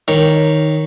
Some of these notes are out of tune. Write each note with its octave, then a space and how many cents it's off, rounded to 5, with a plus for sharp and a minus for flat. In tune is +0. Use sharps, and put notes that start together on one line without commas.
D#3 +0 C#5 +0